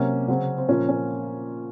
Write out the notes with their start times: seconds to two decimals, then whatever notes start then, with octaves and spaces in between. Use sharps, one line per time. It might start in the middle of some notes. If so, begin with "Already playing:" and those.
Already playing: C3 F#3 A#3 C#4
0.28 C#3 F#3 C4
0.58 C4
0.68 A#2 F3 A#3 C#4
0.89 C#4